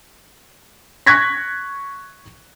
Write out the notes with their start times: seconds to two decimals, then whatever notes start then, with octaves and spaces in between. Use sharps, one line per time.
1.06 C#6 F#6 G#6 A#6 B6